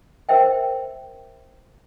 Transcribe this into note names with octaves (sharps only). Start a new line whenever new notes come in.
A#4 C5 E5 G5